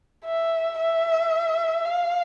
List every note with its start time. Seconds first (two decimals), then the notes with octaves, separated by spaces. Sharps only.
0.25 E5
0.79 E5
1.85 F5